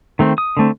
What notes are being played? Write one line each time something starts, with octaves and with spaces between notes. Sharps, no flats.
D#3 A3 C4
D#6
D3 A3 C4